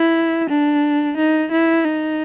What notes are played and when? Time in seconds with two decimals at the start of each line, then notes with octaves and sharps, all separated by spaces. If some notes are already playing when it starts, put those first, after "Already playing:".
Already playing: E4
0.50 D4
1.17 D#4
1.52 E4
1.85 D#4